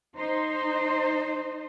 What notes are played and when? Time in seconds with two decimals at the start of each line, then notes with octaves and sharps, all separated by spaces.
0.15 D#4 C5